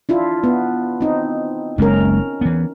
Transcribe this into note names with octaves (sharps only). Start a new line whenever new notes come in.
D4 E4 F4
B3
C4 D#4
F#1 G#3 A#3 C#4 A#4
E3 B3